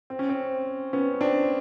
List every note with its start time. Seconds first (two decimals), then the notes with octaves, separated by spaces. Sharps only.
0.10 C4
0.19 C#4
0.29 C4
0.93 B3 C#4
1.21 C4 D4